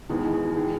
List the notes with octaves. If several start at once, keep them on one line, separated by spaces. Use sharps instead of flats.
E2 D#3 G#3 B3 E4
D#4
E4
F#4
D#3 G#3